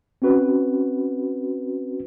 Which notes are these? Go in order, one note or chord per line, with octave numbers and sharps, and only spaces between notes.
C4 C#4 F#4 B4